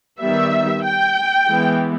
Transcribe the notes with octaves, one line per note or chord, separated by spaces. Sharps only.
D#3 G3 B3 E5
G5
E3 G#3 B3